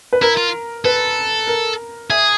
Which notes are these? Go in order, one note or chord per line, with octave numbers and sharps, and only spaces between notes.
B4
E4 A#4
F4
A4 B4
A#4
G#4 E5